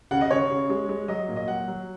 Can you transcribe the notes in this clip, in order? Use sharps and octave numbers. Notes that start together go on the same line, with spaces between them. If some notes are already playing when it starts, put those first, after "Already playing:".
C#3 F#5
D#5
C#3 C#5
C#3
G#3
G#3
F#3 D#5
A#2
D#5
F#3 F#5
F#3